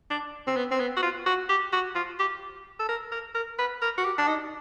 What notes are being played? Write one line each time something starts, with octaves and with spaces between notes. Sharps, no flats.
D4
C4
B3
C4
B3
F#4
F4
F#4
G4
F#4
F4
G4
A4
A#4
A#4
A#4
B4
A#4
F#4
G4
D4
D#4